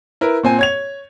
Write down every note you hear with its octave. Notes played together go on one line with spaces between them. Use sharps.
E4 A#4 B4
A#2 C4 G#5
C#5 G#6 F7